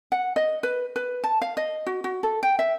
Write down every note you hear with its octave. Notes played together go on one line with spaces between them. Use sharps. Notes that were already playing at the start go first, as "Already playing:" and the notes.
F#5
D#5
B4
B4
A5
F5
D#5
F#4
F#4
A4
G5
E5